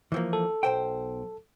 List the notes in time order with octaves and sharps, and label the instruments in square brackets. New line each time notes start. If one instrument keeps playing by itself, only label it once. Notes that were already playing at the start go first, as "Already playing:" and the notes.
[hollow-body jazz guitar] E3 F3 A#3
[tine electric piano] A4
[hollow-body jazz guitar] B1 C5 G5